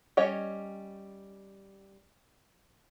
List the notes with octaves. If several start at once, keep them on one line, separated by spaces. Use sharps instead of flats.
G3 C#4 C#5 D#5